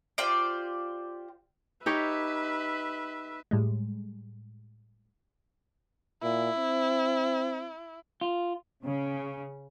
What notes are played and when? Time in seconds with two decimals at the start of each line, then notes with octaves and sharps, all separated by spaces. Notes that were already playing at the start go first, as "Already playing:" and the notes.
0.18 F4 G4 C5 D5
1.86 D#4 G4 B4 C#5 E5
3.51 A2 G3 G#3
6.23 A#2 E4
6.58 C4
8.21 F4
8.84 C#3